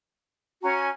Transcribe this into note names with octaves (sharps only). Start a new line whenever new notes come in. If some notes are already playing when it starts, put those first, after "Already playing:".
C#4 F#4 G#5 A#5